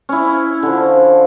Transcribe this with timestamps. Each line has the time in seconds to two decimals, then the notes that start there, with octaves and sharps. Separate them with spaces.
0.09 C#4 E4
0.63 D3 F3